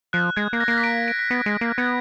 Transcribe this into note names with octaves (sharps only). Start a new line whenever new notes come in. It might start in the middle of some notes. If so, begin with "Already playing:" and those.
F3 F#6
G#3 G#6
A#3
A#6
A#3
B6
D7
D7
B6
B3
G#3
A#3
B3 G#6